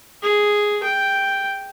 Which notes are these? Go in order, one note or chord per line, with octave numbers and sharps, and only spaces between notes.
G#4
G5